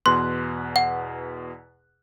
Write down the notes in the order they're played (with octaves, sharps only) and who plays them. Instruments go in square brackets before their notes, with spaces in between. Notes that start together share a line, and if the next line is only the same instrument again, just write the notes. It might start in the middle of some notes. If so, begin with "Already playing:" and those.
[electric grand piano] E2 B2 F#6 [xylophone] C6
[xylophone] F#5